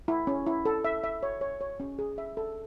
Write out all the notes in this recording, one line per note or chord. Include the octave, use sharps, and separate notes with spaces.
E4
C#4
E4
A4
E5
E5
C#5
C#5
C#5
C#4
G#4
E5
A4